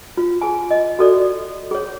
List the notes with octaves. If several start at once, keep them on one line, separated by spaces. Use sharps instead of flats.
F4
G#4 G#5
D#5
F#4 A4 D5
G#4 C#5